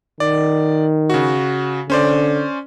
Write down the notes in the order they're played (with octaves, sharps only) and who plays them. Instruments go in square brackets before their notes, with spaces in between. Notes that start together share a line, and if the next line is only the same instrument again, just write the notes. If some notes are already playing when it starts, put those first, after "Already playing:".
[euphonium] D#3 [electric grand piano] D5
[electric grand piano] C#3 F#4
[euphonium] D3 [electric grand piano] C#4 C5 D5